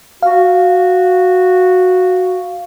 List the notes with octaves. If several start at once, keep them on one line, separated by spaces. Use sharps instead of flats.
F#4 F5